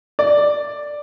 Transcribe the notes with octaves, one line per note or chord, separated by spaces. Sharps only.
D5